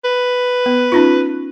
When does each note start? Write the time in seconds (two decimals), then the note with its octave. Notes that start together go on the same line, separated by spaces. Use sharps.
0.05 B4
0.66 B3
0.92 C#4 D#4 F4